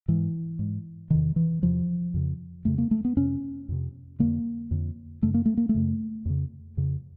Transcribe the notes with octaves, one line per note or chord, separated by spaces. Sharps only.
G#2 E3
G#2
E2 C3 D#3
E3
E2 C3 F3
F2 C#3
F2 C#3 A3
A#3
A3
B3
F2 C3 C#4
F2 C3
F2 D3 A#3
F2 D3
F#2 C#3 A3
A#3
A3
A#3
A3
F#2 C#3
F2 C#3
F2 C#3